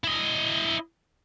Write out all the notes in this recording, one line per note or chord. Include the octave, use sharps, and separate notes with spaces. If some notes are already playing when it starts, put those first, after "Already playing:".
E4 D#5